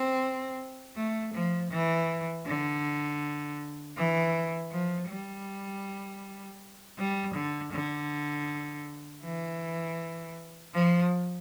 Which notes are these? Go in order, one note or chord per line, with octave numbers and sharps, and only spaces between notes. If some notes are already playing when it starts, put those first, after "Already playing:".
Already playing: C4
A3
F3
E3
D3
E3
F3
G3
G3
D3
D3
E3
F3